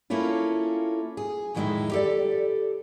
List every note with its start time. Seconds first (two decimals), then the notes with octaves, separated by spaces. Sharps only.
0.10 A3 A#3 C#4 E4 F4
1.17 G#4
1.55 F2 A2 D#3 G#3 E4 E5
1.91 G4 A4 D5